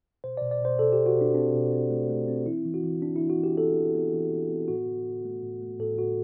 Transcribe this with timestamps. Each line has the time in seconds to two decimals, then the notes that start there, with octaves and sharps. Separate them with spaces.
0.24 B2 C5
0.37 B2 D5
0.51 D5
0.61 B2 C5
0.79 B2 A4
0.93 B2 G4
1.06 F#4
1.16 B2
1.21 D4
1.35 C4 D4
1.54 B2
1.72 C4
1.90 A3
2.09 A3
2.28 C4
2.46 E3 E4
2.65 E3
2.74 F#4
2.84 E3
3.02 E3 D4
3.16 E3 E4
3.30 F#4
3.39 E3 G4
3.57 B3 A4
3.76 E3
3.94 B3
4.13 E3
4.31 E3
4.50 B3
4.68 A2 F#4
4.88 A2
5.06 A2
5.25 A3
5.43 A2
5.62 A3
5.79 A2 A4
5.98 A2 F#4